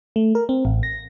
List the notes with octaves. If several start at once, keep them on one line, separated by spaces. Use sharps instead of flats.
A3
A#4
C4
A1
A#6